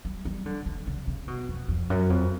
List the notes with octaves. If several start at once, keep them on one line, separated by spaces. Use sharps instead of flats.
G3
G3
D3
D3
C#3
C#3
B2
F2
F2
F#2
F2